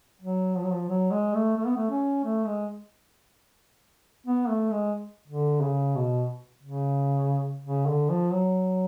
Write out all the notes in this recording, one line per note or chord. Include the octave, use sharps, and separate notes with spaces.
F#3
F3
F#3
F3
F#3
G#3
A3
A3
B3
A3
C#4
A3
G#3
B3
A3
G#3
D3
C#3
B2
C#3
C#3
D3
F3
F#3